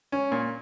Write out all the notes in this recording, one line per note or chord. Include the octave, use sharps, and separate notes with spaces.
C#4
A#2